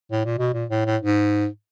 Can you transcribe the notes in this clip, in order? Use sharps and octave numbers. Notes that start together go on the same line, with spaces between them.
A2
A#2
B2
A#2
A2
A2
G#2